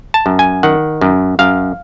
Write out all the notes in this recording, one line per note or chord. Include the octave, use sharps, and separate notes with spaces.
A5
F#2
G#5
D#3 F#5
F#2
F#2 F5